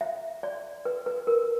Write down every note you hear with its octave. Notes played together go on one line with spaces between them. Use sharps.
E5
D5
B4
B4
A#4